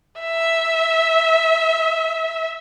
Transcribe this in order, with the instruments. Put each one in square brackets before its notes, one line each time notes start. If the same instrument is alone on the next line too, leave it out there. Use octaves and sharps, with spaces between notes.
[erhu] E5